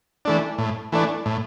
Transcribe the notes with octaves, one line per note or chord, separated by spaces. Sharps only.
E3 A3 D4
A2
E3 A3 D4
A2